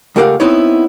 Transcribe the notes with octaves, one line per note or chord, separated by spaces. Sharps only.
C#2 A3 G4 A#4 F5 F#5
B3 C4 D#4 E4 C#5